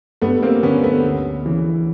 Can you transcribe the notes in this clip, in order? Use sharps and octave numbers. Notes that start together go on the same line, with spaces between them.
G2 A3 B3
A#3 C4
D3 B3 C#4
A3 B3
D2
C#3 E3